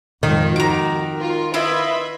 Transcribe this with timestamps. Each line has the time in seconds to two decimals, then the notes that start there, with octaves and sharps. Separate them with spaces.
0.23 F2 G#2 D#3 F3
0.56 F#4 A#5 D6
1.17 F4 A#4
1.54 E4 F4 B4 D#5 E5 B5